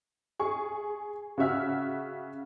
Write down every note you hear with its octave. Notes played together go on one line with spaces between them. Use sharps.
G#4 C#6
C#3 F#4 E5 F6